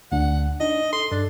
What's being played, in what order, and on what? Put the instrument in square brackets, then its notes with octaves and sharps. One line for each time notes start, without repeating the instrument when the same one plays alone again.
[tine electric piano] D2 D4 [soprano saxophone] F#5
[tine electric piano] D4 D#4 [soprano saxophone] D#5
[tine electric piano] A4 [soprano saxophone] C6
[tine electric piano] G2 A4 [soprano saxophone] D4